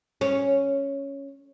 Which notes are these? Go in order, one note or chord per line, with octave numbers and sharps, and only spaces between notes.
C#4